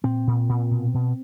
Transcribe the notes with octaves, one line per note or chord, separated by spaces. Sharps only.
A#2 C4
A#2
A#2
B2
B2